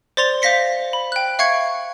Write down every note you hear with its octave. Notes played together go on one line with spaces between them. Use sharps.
C5 D5 C6 A6 F7
C5 E5 F5 A#6 B6 C#7
B5
G5 F#6
E5 F5 C#6 G#6 C#7